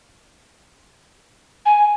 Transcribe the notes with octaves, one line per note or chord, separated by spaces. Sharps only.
G#5